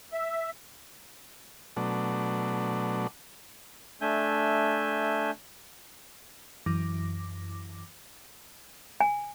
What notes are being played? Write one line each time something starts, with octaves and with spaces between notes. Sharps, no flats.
E5
B2 F#3 A3 D4
A3 D4 E5 G#5 G6
F#2 E3 D6 A#6
G#5